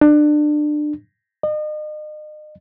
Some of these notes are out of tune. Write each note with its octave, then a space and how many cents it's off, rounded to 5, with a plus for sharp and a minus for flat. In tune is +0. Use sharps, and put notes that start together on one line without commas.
D4 +25
D#5 -40